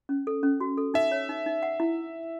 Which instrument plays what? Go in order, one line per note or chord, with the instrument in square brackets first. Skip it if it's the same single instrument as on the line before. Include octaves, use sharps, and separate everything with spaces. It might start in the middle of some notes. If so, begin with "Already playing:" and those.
[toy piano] C#4
A4
C#4
F#4
A4
[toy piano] D#4 [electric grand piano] E5
[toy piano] C#5
D#4
D#4
F#5
E4